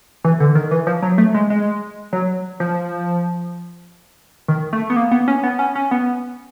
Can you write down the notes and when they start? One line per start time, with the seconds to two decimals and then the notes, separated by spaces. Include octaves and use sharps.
0.24 E3
0.40 D3
0.55 D#3
0.71 E3
0.87 F3
1.02 F#3
1.18 A3
1.34 G#3
1.50 G#3
2.13 F#3
2.60 F3
4.48 D#3
4.73 A3
4.90 B3
4.96 A#3
5.11 B3
5.28 C#4
5.43 B3
5.59 C#4
5.75 C#4
5.91 B3